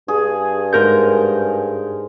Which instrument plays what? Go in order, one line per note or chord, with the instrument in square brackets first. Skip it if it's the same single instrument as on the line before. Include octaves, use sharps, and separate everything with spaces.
[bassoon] G2 [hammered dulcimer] G#4
[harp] G#2 A#4 G6